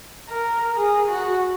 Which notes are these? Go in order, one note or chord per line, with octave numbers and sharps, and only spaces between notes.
A#4
G#4
F#4